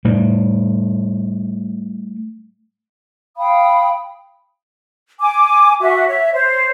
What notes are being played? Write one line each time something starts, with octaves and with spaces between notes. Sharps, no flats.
A2 G3
F5 G5 B5 D#6
G#5 D6
F#4 E5
C#5 E5
C5 C#5